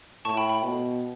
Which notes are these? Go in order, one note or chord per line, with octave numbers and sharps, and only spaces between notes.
A2 A5 C#6
G5 B5
G5 B5
B2